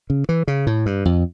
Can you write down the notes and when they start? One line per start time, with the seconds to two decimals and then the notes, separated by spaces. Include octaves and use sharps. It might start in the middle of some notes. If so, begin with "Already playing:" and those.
0.10 C#3
0.29 E3
0.48 C#3
0.67 A2
0.86 G2
1.05 F2